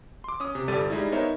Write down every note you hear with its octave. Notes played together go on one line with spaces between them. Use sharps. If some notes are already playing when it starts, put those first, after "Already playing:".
C6 D6
C#4 D#6
C3
G1 G3 A4 A6 D#7
G3 G#3 D#4 E4
B3 D#4 A#4 C5 C#5 E5